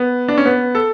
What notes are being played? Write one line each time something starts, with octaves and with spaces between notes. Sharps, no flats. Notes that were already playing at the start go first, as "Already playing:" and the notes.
Already playing: B3
D4
C#4
B3
A4